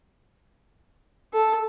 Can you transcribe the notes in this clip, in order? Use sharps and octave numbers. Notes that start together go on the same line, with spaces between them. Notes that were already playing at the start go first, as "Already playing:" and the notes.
A4